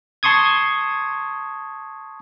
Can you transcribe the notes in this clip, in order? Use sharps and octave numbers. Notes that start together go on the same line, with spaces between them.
A5 C6 C#6 D#6 G#6